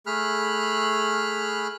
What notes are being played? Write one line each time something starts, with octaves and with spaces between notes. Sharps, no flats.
A3 G#4 B5 F6 F#6